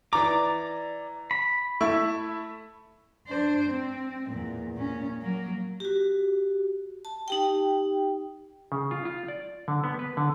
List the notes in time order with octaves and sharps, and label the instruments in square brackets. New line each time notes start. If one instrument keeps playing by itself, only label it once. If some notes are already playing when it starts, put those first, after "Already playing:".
[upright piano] E3 A#5 [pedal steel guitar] D5 D6
[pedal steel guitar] B5
[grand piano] A3 E4 [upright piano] C#6
[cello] D4 C5
C4
E2 A#2
A#2 C#4
F#3 A#3
[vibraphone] F#4 G4
A5
D#4 G4 G5
[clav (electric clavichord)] C#3
F4
F4
D5
D3
B3
B4
D3